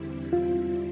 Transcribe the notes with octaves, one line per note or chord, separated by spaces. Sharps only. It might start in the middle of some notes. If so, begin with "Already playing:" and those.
Already playing: E2 D3 G3 C4 E4
F4